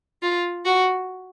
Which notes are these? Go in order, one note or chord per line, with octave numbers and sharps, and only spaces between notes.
F4
F#4